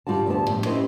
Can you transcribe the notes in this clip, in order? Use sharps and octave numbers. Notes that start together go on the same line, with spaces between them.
G2 D#3 G3 F4 F#4 A5
D2 G2 C3 B3 A5
A2 F3 G3
C#4 E4 F#4 G4 C5 D#5